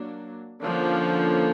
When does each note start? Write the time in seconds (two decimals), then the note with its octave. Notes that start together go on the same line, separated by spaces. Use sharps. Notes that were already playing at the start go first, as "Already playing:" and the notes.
Already playing: F#3 A#3 D4
0.61 D3 F3 A#3 C#4 D4